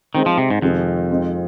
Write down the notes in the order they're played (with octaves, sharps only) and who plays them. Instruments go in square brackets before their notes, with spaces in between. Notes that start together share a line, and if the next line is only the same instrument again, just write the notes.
[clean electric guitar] D#3 [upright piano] G#3 C4 D#4 C5
[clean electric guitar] F3
C3
G#2
[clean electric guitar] F2 [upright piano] C3 D#3 G#3 C4 G#4
[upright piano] G#3 C4 D#4 C5